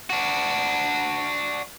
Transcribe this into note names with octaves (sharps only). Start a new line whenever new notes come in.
D4 F#4